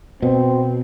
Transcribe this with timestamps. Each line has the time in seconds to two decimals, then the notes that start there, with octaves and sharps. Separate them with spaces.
0.22 B2 C4